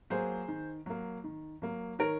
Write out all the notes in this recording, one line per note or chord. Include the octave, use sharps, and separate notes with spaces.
F#3 A#3 G#4 C5
D#3
F#3 A#3
D#3
F#3 A#3
D#3 A#4 C#5